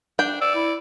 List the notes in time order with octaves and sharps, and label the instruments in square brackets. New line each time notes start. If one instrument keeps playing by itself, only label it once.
[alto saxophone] D4 [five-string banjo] G5
[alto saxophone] D5 [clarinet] E6
[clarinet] E4